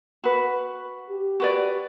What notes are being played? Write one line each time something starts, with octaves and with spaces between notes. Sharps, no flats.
F#4 B4
G4
F#4 B4 D5